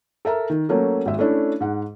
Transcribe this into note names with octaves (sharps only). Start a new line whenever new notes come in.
A4 A#4 E5 A#5
D#3
F#3 A3 A#3 C#4
G#1 E5
A3 C#4 D4 E4
G#2 F#5